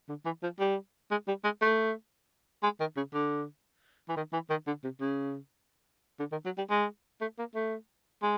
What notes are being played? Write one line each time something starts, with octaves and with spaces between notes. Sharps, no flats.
D3
E3
F3
G3
G#3
G3
G#3
A3
G#3
D#3
C#3
D3
E3
D#3
E3
D#3
D3
C3
C#3
D3
D#3
F#3
G3
G#3
A3
A#3
A3
G#3